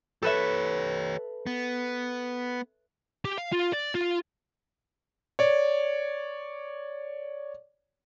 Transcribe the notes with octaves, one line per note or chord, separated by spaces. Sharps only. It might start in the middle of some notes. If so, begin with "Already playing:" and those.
G4 A4 B4 C#5 E5
B3
G4
F5
F4
D5
F4
C#5 D5